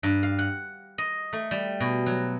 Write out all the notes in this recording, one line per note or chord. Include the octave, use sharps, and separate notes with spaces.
G2
F5
F#5
D#5
A3
G3
B2
F#3